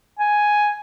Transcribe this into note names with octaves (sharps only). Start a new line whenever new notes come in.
G#5